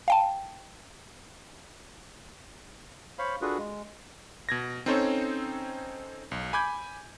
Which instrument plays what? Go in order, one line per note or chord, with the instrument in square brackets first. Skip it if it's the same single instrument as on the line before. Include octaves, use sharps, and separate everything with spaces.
[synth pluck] F5 G5 A5
[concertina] C5 C#5 F5 B5
D4 F4 F#4 G#4 A4 B4
G#3
[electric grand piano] B2 G#6 A#6
C4 C#4 D#4 A4 C5 C#5
B1
G#5 B5 D6 G6 G#6